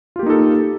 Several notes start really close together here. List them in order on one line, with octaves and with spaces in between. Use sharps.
F4 G4 A#3 D#4 A4